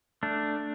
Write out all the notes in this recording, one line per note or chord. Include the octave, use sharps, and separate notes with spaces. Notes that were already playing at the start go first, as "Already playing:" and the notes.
A3 D4